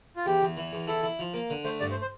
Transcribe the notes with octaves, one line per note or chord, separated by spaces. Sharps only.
F4
E2 G4
E2
E3
E2
E4 A4
E4
F3
A#3
D3
A3 C5
G2 D5
C5
C5